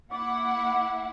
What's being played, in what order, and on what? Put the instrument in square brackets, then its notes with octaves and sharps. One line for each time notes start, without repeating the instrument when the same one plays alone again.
[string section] A#3 E4 F#5 [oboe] D6